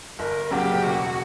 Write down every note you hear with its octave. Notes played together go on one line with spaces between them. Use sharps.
G1 A#4
F#2 C#3 F#3 A#3 G4
E1 F#4